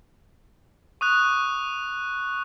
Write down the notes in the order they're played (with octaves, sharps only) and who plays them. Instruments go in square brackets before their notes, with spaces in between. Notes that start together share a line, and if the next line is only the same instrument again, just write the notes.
[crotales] C#6 D#6 F#6